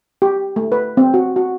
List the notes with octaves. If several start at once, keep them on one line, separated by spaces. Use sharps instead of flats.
G4
A3
B4
C4
F#4
F#4